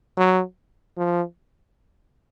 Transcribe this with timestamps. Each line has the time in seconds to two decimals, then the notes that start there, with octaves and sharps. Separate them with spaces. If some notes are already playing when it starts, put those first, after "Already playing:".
0.17 F#3
0.98 F3